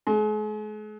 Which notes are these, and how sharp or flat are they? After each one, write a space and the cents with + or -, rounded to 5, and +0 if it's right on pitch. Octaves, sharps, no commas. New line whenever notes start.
G#3 +40